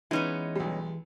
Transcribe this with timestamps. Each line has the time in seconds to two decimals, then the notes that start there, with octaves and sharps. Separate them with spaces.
0.11 E3 G#3 B3 C#4 D#4 E4
0.56 B1 G3